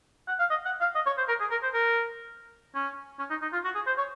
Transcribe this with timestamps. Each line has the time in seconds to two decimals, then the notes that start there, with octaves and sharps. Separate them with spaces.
0.28 F#5
0.39 F5
0.50 D#5
0.65 F#5
0.80 F5
0.95 D#5
1.06 C#5
1.18 C5
1.28 A#4
1.40 G#4
1.51 A#4
1.63 C5
1.73 A#4
2.75 C#4
3.19 C#4
3.30 D#4
3.42 D#4
3.52 F4
3.64 F#4
3.75 G#4
3.87 C5
3.98 C#5